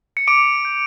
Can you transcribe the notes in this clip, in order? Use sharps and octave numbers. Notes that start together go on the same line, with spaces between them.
C#7
D6 D7
G6